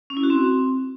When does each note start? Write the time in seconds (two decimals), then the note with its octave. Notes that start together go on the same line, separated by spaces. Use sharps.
0.10 C#4
0.17 E4
0.23 F#4
0.30 C4